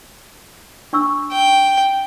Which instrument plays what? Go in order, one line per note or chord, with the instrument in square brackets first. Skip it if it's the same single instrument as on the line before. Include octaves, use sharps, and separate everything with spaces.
[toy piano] D4 C#6 E6
[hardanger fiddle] G5